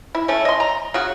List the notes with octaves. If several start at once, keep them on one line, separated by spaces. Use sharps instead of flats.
E4
A3 C#4
D#5 C6
A#5
C#3 F#4